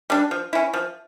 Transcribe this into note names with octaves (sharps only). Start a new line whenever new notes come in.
G3 D4
F3
C#4 E4
F3